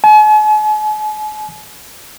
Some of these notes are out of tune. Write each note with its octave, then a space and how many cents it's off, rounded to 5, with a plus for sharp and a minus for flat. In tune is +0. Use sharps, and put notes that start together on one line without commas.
G#5 +45